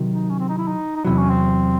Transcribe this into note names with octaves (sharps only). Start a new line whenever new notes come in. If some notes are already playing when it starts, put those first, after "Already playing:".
Already playing: C3 D#3 F#3
D#4
C#4
C4
D#4
E4
D#4
D#4
E2 C3 F#3 E4
C#4
C4